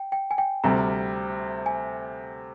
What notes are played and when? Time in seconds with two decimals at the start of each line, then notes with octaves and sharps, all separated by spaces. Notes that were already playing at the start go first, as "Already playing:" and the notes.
Already playing: G5
0.12 G5
0.31 G#5
0.38 G5
0.64 D2 C3 G3 A#5
1.66 G#5